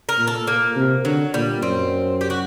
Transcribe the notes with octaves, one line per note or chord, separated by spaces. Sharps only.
A#4
A#2
A4
A#2 A#3
C3
D3 F#3
A#2 G3
F#2 C4
G4
F#4